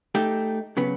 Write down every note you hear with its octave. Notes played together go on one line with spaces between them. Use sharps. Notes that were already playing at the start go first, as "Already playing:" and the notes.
A3 D#4 G4
C#3 F#3 B3